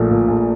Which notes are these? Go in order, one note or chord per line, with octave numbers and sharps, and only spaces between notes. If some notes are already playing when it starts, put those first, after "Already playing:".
Already playing: A#1 A#2 F3 A3
A#2
A#1